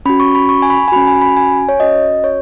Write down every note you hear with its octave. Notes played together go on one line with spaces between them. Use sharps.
C#4 F#4 B5
C#6
B5
C#6
G#5
B5
G#5
C#4 F#4 B5
G#5
B5
G#5
C#5
C#4 F#4 D#5
C#5